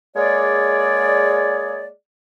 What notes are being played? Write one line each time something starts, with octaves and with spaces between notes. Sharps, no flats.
G#3 A#3 G#4 C#5 D5